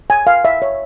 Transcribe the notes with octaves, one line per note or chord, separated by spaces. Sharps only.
G#5
F5
E5
C#5